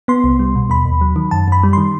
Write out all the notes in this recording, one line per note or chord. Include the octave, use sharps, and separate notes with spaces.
B3 C6
C2
G3
B2
D#2 B5
D#2
F#3
D#3
F#2 A5
F#2 B5
G3
D#3 C6